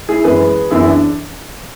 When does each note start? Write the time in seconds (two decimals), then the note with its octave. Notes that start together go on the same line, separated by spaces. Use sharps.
0.09 E4 G#4
0.24 F#2 E3 G#3 G#4 B4
0.71 F#2 E3 B3 E4 G#4
0.87 D4